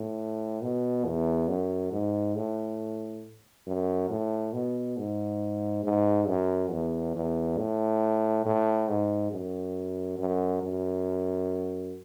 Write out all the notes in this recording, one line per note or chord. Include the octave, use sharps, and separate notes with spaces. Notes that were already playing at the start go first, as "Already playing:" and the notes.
Already playing: A2
B2
E2
F#2
G#2
A2
F#2
A2
B2
G#2
G#2
F#2
E2
E2
A2
A2
G#2
F#2
F#2
F#2